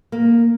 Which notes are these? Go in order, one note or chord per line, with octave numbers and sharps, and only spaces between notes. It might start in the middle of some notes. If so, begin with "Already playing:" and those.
A#3